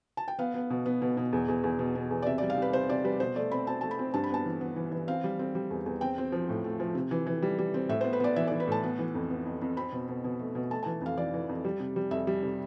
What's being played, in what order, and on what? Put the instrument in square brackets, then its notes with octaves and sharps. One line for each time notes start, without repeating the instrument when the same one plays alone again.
[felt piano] A5
G5
B3 F5
B3
B2
B3
B2
B2
E2
E2
E2
B2
B2
E2
D5
C3 E5
G3 D5
F5
C3 B4
C3 C5
C3 D5
G3 B4
B2 C5
A3 D5
C4 B5
C4 A5
A3 A5
B5
C4
G2 A5
B5
B3 A5
E3
B3
E3
E3
C4 F5
G3
C4
G3
E2
E2
C4 G5
C4
F3
A2
A3
F3
C3
E3
E3
G3
G3
C4
A2 E5
B3 C5
B4
B3 D5
E3 E5
E3 D5
B4
A2 A5
B3
E3
F2
B3
F2
F2
C4 B5
B2
B2
B2
A3
B2
A3 A5
E3 A5
F2 F5
E3 D5
E3
F2
G3
C3
G3
F2 E5
G3
C3